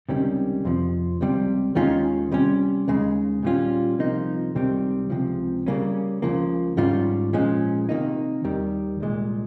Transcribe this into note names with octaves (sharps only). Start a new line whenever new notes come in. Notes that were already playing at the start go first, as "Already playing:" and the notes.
C#2 C3 D#3 G3 C#4
F2 C3 F3
C#2 C3 G3
D#2 D#3 G#3 C#4 F4
C3 G3 C#4
D#2 C#3 G#3
A#2 G3 C#4 F4
C2 C3 F3 A#3 D#4
C#2 C3 D#3 G3 C4
C#2 C3 F3
C#3 G3 A#3 C#4
C#2 C#3 F3 A#3
G#2 D#3 G3 C#4 F4
A#2 F3 G#3 C#4
C3 D#3 A#3 D#4
D#2 D#3 G3
C2 A#2 G#3